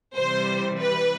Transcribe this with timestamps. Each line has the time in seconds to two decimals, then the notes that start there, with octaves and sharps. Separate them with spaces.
0.15 C3 E3 G3 C5
0.80 B4